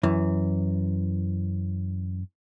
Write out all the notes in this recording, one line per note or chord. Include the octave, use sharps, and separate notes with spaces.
F#2 E3